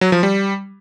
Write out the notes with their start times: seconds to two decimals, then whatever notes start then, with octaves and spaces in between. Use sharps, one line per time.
0.01 F#3
0.12 F3
0.23 G3